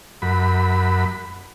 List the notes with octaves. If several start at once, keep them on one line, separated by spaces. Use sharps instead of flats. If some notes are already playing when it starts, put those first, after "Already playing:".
F#2 B5